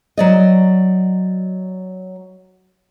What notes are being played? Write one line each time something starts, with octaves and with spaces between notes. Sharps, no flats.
F#3 D5 D#5